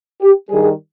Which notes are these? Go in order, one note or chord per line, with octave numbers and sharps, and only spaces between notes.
G4
G2 D#3 G3 G#4